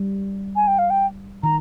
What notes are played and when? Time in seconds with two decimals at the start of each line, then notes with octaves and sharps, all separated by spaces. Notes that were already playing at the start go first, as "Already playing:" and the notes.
Already playing: G3
0.56 G#5
0.67 G5
0.79 F5
0.90 G5
1.43 D#3 A#5